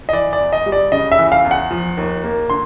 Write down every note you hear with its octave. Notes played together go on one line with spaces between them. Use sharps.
D#5
E3 D5
D5
E2
D#5
G3
D5
C#3 D#5
E5
E3
F5
E2
F#5
F3
D#2
A#3
D3 C6